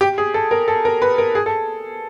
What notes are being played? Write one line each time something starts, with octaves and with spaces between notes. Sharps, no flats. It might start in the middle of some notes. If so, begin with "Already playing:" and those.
G4
G#4
A4
A#4
A4
A#4
B4
A#4
G#4
A4